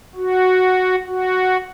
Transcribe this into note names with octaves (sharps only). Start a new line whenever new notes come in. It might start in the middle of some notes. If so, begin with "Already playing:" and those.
F#4
F#4